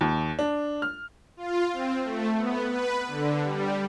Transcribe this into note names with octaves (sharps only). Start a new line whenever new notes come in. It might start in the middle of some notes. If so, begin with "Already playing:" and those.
D#2
D4
F6
F4
C4
A3
B3
B4
D3
G3